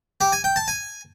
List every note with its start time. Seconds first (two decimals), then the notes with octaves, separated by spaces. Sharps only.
0.21 G4
0.32 G#5
0.44 G5
0.56 A5
0.68 G#5